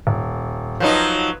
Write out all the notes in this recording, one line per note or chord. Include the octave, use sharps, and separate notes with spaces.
D#1
F3 F#3 D#4 B4